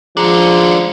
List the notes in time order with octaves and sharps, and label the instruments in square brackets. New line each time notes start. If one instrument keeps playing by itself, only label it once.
[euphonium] F3 [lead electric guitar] G#3 D4 [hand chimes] G#4 A#5 C#7